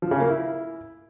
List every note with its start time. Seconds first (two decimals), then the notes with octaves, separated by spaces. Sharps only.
0.02 F3
0.11 C#3
0.20 A#3
0.29 E4